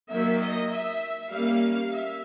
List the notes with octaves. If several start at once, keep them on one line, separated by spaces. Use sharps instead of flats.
D#3 F#3 A#3 E5
D#5
E5
G3 A#3 C#4 F5
E5